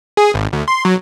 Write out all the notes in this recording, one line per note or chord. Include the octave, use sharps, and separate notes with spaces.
G#4
G#1
D2
C6
F#3